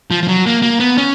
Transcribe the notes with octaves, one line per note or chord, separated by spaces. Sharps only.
F3
F3
F#3
A#3
A#3
B3
C#4